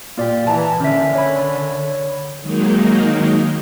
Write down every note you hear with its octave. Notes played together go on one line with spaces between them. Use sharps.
A#2 A#3 F4 G4 D5
E3 A5 A#5
D3 C#4 A#4 E5
C#5 B5
D#3 F#3 G#3 A#3 D#4